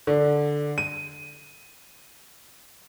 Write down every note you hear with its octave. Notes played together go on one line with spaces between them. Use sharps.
D3
D#7